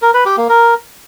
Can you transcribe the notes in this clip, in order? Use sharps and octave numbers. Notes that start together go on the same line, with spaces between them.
A#4
B4
G4
A#3
A#4